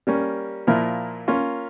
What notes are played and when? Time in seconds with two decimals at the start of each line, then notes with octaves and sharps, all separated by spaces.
0.07 G3 A#3 C#4
0.67 A#2 F3 A#3 E4 A#4
1.28 A#3 C#4 F4